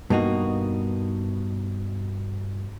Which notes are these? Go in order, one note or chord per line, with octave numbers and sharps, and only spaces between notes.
G2 B2 A#3 D#4 F#4